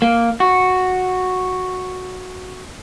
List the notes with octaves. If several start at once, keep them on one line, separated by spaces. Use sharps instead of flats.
A#3
F#4